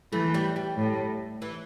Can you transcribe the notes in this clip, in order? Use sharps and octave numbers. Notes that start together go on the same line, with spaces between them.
E3 A3
G3
G3
A2
E3